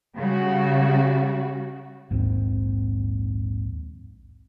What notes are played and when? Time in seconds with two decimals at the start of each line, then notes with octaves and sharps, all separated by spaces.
0.17 C#3 G3 F#4
2.10 A#1 D#2 G#2 C4